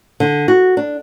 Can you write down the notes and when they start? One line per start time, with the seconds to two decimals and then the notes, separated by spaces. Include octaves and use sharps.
0.20 D3
0.48 F#4
0.77 D4